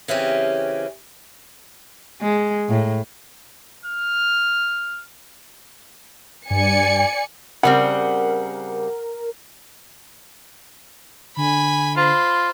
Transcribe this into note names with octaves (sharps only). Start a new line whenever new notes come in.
C#3 E3 C4 C#4 G4
G#3
A2
F6
G2 D5 G#5 C#7
C#3 G3 C4 A#4 F#5
D3 G#5 B5
F4 C5 B5